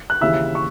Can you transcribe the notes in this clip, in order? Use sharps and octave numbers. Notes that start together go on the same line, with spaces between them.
F#6
D#2 C#3 E3 E5 E6
C#6